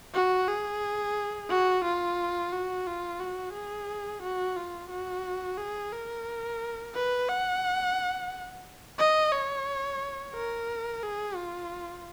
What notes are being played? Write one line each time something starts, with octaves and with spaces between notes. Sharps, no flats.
F#4
G#4
F#4
F4
F#4
F4
F#4
G#4
F#4
F4
F#4
G#4
A#4
B4
F#5
D#5
C#5
A#4
G#4
F4